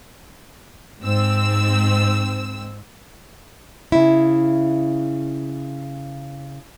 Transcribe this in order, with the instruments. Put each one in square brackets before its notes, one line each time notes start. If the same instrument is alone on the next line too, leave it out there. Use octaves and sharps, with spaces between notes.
[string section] G#2 C4 E6
[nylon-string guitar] C#3 E4